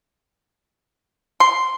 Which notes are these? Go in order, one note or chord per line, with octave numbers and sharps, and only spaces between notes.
C6